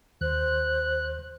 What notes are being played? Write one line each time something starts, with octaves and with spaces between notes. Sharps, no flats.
D#2 C5 F#6